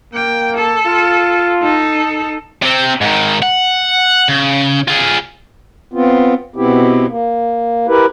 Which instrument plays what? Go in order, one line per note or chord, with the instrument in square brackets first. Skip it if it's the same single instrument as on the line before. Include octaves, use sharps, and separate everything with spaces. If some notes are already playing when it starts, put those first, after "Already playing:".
[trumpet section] A#3 [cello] G5
[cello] A4
[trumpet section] F4
[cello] D#4 A4
[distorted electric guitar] C3 C4
G#2 D#3
F#5
C#3
F4 G#4
[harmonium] B3 C4 F4
B2 B3 C4 E4 G4
A#3
E4 G4 A#4 B4